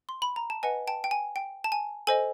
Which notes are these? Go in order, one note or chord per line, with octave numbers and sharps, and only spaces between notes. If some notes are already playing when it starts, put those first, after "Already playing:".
C6
B5
A#5
A5
B4 D#5 F#5 G#5
G5 A5
G5
G#5
G5
A5
G#5
A4 C5 D#5 G#5